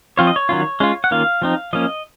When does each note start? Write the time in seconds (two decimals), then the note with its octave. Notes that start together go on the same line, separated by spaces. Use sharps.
0.17 F3 C4 F4 C#5
0.27 D#5
0.36 C#5
0.49 D#3 F#3 C#4 F4
0.80 G#3 C#4 F4
1.04 F#5
1.11 D#3 A#3 C#4 F4 F5
1.42 F3 C4 D#4
1.73 F3 A#3 C#4 D#5